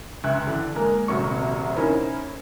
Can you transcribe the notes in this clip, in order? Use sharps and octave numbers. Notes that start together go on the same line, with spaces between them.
C#2 E5 G5 F#6
D3 E3 D4
G#3 A#3 A#4
D#1 C2 C3 F#3 C#6
C#4 D#4 E4 A#4 C5